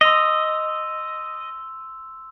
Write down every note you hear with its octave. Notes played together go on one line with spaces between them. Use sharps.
D#5 C6 E6 F7